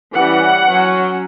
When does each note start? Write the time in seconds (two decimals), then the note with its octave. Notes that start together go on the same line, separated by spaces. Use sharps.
0.15 E3 G3 C#4 F#5
0.68 F#3 C#4